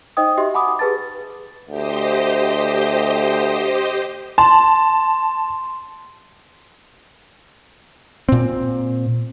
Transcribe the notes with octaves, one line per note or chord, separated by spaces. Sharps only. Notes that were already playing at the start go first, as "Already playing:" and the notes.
D#4 C5 D#5 G5 D#6
F#4 G4 D#5 E5 C6
F#5 G#5 B5 D6 D#6
G4 G#4 B4 A5 A6
D2 G4 C5 D#5
A5 C6
A#2 C4